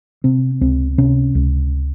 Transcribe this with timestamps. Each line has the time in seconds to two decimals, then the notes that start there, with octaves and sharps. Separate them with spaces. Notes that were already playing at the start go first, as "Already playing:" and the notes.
0.24 C3 C4
0.61 C#2 C4
0.98 C3 C#4
1.35 C#2